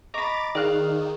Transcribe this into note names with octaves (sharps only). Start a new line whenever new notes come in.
D#5 A#5 B5 C#6 D6 A6
D#3 G#4 D5 F5 F#6